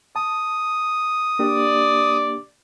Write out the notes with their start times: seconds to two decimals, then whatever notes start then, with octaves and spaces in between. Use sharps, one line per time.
0.16 A5 D#6
1.39 A#3 D4 G4 D5